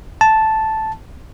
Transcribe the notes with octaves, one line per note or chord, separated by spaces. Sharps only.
A5